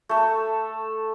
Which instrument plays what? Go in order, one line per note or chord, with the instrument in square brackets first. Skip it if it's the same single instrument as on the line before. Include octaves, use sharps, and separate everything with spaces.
[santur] A3 A4